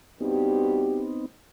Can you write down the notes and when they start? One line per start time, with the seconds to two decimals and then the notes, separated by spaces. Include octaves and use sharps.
0.21 G2 B3 C4 D#4 F#4 G4